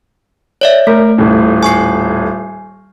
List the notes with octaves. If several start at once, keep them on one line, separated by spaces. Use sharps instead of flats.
C#5 D5 E5
A3 A#4
D#1 A2
G#5 C#6 C7